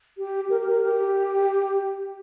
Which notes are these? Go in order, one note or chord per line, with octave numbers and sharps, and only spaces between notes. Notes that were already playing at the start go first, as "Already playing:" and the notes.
G4
A#4
G4
A#4
G4